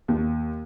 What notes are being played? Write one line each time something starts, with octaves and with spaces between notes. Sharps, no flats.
D#2